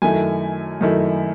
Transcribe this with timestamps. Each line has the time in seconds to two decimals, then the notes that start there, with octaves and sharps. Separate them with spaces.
0.02 F#2 D#3 A3 E4 G#5
0.81 F#2 D#3 A3 E4